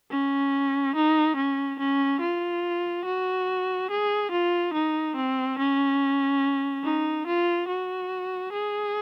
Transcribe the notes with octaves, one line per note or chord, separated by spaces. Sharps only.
C#4
D#4
C#4
C#4
F4
F#4
G#4
F4
D#4
C4
C#4
D#4
F4
F#4
G#4